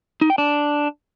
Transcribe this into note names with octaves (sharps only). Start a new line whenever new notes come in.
D#4
G5
D4